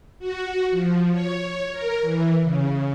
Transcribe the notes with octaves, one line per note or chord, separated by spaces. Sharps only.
F#4
F3
C#5
A#4
E3
C#3